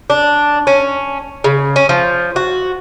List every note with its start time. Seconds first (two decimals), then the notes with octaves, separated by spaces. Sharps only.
0.10 D4
0.67 C#4
1.44 C#3
1.76 C#4
1.89 F3
2.36 F#4